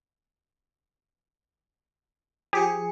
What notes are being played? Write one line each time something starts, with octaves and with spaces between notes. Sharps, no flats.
F3 G4 G#4 C#7